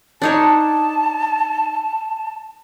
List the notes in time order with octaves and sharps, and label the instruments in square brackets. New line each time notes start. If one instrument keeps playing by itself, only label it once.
[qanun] D4 D#4 C#5 [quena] A5